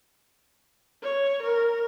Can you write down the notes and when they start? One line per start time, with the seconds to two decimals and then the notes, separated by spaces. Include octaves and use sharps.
1.03 C#5
1.42 A#4